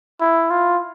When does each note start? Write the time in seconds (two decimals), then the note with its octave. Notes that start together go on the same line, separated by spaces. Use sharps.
0.21 E4
0.50 F4